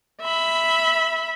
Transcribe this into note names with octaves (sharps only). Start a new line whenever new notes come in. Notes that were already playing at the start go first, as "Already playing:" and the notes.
E5 B5